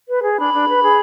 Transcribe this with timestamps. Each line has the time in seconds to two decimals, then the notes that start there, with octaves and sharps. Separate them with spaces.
0.08 B4
0.22 G#4
0.37 D4 B5
0.52 D4
0.68 B4
0.82 G#4